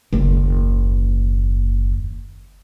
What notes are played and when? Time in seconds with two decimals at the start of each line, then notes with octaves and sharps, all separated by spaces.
0.13 F#1 D#2